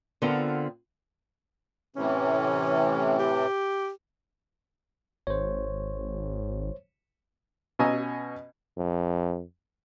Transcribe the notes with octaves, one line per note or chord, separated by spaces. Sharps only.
D3 B3 C4 F4 A4 A#4
A2 C3 E3 C#4
G4
G#1 C5 C#5
B2 C#4 D#5 G#5 A#5 E6
F2